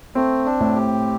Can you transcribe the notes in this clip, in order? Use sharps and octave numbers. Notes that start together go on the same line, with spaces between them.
A3 C4
D4
A2
G4